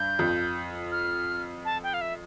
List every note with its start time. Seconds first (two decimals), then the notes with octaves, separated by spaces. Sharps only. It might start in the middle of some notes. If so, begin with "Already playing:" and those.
Already playing: G2 G6
0.19 F2
0.92 F6
1.65 A5
1.83 G5
1.94 F5
2.01 E5